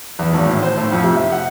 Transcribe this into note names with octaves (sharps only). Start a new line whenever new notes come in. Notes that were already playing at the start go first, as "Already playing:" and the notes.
E2
G#1
A2
C5
A2
F2
C3
E5
F#5